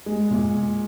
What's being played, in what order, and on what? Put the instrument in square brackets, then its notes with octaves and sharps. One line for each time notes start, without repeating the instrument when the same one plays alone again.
[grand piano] G#3
A#2